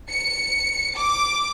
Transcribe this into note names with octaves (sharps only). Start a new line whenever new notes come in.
C#7
D6